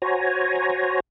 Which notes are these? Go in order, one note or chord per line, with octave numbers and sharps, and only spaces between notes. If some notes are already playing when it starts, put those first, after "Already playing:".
F#4 C5 C#5 G#5 A#5